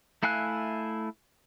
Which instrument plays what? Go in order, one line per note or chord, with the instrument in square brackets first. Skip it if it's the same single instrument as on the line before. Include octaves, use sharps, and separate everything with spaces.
[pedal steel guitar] A3 E4 F5 G#5 F#6